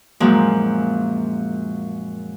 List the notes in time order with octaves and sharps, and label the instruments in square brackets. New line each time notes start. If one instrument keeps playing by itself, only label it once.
[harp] F#2 A#2 F3 G#3 A#3